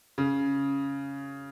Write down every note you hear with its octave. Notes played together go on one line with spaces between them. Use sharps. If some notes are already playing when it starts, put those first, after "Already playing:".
C#3